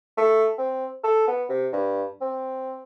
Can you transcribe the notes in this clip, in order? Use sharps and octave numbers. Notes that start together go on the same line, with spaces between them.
A3
C4
A4
B3
C3
G2
C4